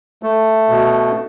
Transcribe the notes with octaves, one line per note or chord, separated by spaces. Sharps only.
A3
B2